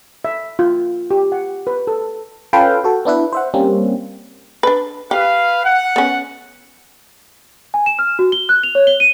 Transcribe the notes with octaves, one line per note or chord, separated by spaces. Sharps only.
E5
F4
G4
F#5
B4
A4
C#4 F4 A4 B4 F5 G5
F#4 A4
B3 D4 E4 B4
C5 E5 F#5
G3 A#3 C4 C#4
D4 B4
G4 B4 F5
F#5
B3 C#4
G#5
E7
F6
F#4
G7
F#6
F7
C#5
G7
D#7